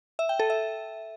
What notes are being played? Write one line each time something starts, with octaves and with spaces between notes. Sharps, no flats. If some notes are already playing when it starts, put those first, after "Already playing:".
E5
G5
A4
E5